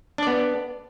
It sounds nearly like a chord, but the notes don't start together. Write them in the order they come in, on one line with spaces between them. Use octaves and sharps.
D4 D5 B3